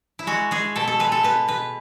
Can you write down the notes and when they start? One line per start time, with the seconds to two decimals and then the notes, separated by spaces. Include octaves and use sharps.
0.19 E4
0.27 G#3 F#4
0.51 G#3 G#4
0.76 B2 A4
0.88 A4
0.99 G#3 B4
1.12 A4
1.23 B2 B4
1.48 B2 B4